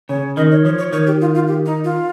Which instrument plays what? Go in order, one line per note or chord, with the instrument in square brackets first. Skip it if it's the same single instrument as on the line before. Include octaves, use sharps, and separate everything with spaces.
[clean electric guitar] C#3 [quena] C#5
[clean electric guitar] D#3 [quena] D#5
[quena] C#5
[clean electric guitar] F3 [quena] C#5
[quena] C#5
[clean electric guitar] D#3 [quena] C#5
[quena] G4
F4
F4
G4
D#4
F4